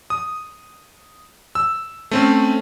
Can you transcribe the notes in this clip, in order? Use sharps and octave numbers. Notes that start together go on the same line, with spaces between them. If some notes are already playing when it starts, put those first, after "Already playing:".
D#6
E6
A3 C4 C#4